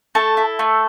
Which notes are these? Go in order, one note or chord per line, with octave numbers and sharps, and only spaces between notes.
A3 A4
E4
A3